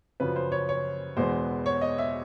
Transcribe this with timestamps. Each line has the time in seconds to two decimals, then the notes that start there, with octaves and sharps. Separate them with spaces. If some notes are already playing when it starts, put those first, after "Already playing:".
0.20 F#2 C#3 F3 B4
0.36 C5
0.52 C#5
0.69 C#5
1.17 E2 B2 G#3 B3 C5
1.66 C#5
1.81 D#5
1.98 E5